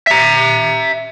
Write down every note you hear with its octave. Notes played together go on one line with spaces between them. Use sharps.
E5 A#5